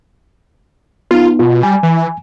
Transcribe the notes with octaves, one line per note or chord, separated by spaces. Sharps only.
B3 D#4 F4
B2 F4
G3 G#5
E3